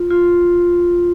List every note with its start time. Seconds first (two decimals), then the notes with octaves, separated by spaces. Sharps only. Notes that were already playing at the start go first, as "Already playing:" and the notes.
Already playing: F4
0.11 F4